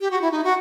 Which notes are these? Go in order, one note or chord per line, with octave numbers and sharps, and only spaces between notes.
G4
F#4
E4
D#4
F#4